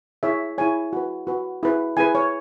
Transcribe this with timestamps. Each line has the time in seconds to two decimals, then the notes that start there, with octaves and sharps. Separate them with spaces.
0.23 E4 G#4 C#5 E5
0.58 E4 G#4 C#5 G#5
0.93 F#4 B4
1.27 F#4 B4
1.63 E4 G#4 B4
1.97 E4 G#4 B4 G#5
2.15 C#5